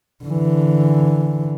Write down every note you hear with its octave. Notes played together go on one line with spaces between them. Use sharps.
D3 E3